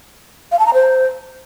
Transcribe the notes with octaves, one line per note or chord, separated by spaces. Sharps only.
F5
A5
A#5
C5